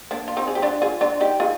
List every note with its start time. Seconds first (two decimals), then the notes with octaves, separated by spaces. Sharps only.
0.11 A#3 D4
0.28 F4
0.37 C4 D#4
0.48 G#4
0.55 G4
0.62 D4 F4
0.82 F4 G#4
1.01 D4 F4
1.21 D#4 G4
1.40 F4 G#4